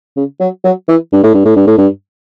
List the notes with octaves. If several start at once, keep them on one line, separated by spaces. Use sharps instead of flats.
C#3
F#3
F#3
E3
G2
A2
G2
A2
G2
A2
G2